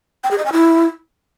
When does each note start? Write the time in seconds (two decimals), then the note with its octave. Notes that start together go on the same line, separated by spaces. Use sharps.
0.24 G5
0.31 G#4
0.38 D#5
0.45 G#5
0.53 E4